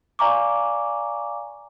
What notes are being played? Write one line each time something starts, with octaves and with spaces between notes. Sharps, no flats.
D5 F5 G#5 A#5 C#6 D6